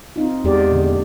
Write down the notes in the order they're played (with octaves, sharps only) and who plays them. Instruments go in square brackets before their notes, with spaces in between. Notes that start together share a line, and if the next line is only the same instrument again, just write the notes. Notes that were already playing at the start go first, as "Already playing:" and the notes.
[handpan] C4 D#4 F4
[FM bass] E2 [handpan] G#3 G4 D5
[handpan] A#2 D3